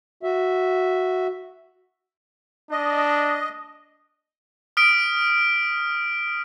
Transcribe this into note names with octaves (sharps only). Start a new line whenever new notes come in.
F#4 E5
D4 D#5
D#6 F6 B6 D7